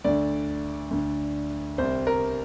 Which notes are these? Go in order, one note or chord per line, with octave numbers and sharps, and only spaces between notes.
D2 D3 D5
D2 D3
C2 C3 C5
A#4